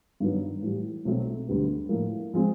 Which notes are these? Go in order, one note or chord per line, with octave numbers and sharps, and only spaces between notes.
G2 D#3 F#3 B3
A2 E3 G3
B1 B2 F#3 A3 C4
D2 D3 G3 B3
A2 F3 A#3
F3 G#3 C4